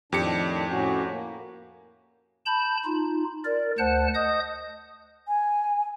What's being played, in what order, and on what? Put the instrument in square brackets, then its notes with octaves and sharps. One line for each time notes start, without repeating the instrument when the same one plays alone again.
[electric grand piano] F2 G4 C#7 [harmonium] A2 D#3 D4
[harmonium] A2 C#4 F#4
A#3
[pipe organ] A5 B5 G6
D#4 F4
A#4 D5
D2 C5 F#5 A5 F#6
D#5 D#6 G6
[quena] G#5